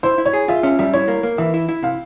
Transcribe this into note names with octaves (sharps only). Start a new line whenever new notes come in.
E4 C5
E4
C#5
G#4
F4 E5
C#4 E5
G3 E5
E4 C#5
A#3
A#3
E3 E5
E4
E4
C3 F5